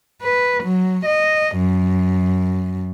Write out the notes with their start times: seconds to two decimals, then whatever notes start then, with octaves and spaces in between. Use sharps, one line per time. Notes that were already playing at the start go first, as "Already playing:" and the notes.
0.22 B4
0.64 F#3
1.06 D#5
1.57 F#2